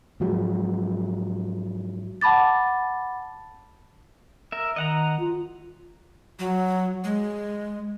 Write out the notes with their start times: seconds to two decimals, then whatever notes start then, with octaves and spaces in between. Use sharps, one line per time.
0.20 G#2 F3 F#3 G#3
2.21 F#5 A5 B5 D6 A6
4.52 A#4 E5
4.76 D#3 D#5 F#5 A#5
5.19 F4
6.39 F#3
7.04 G#3